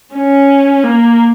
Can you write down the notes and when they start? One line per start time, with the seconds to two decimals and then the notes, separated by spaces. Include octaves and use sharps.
0.15 C#4
0.84 A#3